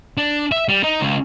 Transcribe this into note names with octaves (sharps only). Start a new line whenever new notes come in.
D4
E5
G3
D#4
C#2